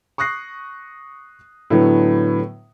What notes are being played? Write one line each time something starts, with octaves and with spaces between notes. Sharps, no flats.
C#6 D#6 F#6 A#6 C7
A2 D3 F#3 A3 B3